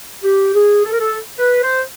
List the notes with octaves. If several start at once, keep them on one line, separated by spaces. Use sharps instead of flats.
G4
G#4
A4
A#4
A4
B4
C5